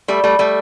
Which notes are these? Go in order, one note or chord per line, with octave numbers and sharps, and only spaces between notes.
G3 A3
G3 A3
G3 A3